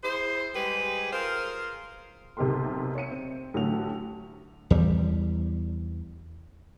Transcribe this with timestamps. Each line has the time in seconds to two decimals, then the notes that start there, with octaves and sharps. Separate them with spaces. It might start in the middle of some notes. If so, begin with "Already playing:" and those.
0.04 E4 G#4 C5
0.55 G3 G#3 G4 G#4 B4
1.12 F4 G#4 A#4 C5
2.37 B1 C3 D#4 G4 A#4 C6
2.95 C#5 E5 C#7 D#7
3.11 C4
3.54 A1 D3 F#3 A3 F#4 F7
4.70 E2 G3